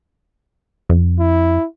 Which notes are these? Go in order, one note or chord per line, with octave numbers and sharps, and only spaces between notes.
F2
E4